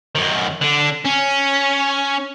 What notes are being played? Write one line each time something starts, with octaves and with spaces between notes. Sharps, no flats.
F#2 D#3
D3 D4
C#4